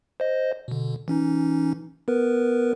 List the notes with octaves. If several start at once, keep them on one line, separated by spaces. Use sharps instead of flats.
C5 D#5
B2 D3
E3 C#4 D#4
B3 A#4 B4